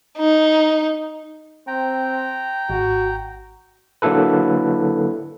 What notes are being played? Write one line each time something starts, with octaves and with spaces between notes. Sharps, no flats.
D#4
C4 G5 A#5
G#1 F#4
D3 F#3 A#3 E4 A4 B4